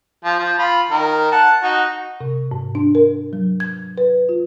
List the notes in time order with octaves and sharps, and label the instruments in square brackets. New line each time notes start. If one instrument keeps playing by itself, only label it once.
[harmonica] F3
F3
F4 B5
D#3 A#4
F#5 A5
D#4 F#4 A#5
[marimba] C3
G#2
D4
A#4
F#3
G#6
B4
F4